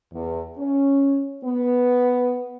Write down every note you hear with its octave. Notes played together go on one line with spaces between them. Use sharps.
E2
C#4
B3